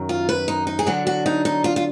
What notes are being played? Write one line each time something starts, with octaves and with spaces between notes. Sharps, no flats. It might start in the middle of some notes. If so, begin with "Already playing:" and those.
Already playing: F#2 D#3 F#3
F4
B4
D#4
D#4
G#4
D3 F#3 D4 F#4
F#4
D#4
D#4
F4
F4